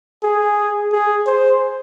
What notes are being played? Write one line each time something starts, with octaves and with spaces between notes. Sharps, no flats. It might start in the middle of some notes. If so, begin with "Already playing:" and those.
G#4
G#4
C5